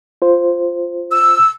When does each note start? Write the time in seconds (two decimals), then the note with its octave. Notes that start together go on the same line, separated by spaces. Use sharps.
0.22 F4 C5
1.12 E6